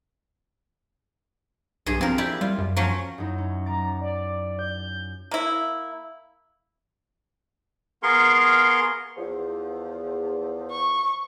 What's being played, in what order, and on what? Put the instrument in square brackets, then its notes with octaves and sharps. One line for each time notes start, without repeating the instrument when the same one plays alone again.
[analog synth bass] B1 [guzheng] G2 G#4
[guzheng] F3 A#4 [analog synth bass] C4
[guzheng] E4 G4 D5
[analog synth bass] G3 [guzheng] F4
[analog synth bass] F#2
[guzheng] F3 F#3 C#4
[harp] F#2 D#4 E4
C#4
[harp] F#3 D6 A6 [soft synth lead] A#5
[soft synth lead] D5
G6
[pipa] A#3 E4
[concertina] B3 G#4 A#4 F5 C6 C#6
[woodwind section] E2 F3
[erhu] C#6